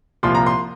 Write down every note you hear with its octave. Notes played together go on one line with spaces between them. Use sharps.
C2 A#2 F3 C6
A#5
C6